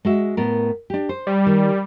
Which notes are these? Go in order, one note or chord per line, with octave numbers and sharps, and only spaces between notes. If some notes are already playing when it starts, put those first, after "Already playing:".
G#3 F#4 E5
A2 B3 A#4
D4 G4
C5
G3
D#3